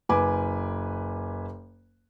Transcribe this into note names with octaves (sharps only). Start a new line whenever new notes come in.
F#1 B4 G#5 D6